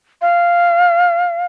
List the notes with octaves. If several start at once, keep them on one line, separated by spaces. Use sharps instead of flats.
F5